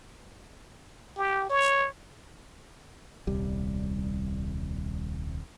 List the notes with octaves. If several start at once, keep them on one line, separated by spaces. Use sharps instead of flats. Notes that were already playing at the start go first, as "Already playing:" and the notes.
G4
C#5
D#1 C2 G3